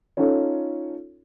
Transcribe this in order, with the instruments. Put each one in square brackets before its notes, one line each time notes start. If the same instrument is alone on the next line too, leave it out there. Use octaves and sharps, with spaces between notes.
[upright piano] C#4 D#4 F4 A4 C#5